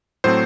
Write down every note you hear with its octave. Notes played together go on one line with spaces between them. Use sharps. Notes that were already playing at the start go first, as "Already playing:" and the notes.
A2 F#3 A3 C4 C5